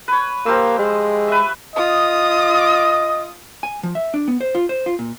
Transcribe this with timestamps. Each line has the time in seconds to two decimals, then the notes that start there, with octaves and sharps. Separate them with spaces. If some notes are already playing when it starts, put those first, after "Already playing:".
0.08 B4 C#5
0.46 F3 A#3 G4 E6
0.79 G#3
1.28 B4 E5
1.76 F4 D#5 D#6
3.63 G#5
3.83 F3
3.95 E5
4.14 D4
4.28 B3
4.41 C5
4.55 F4
4.69 C5
4.86 F4
4.99 A#2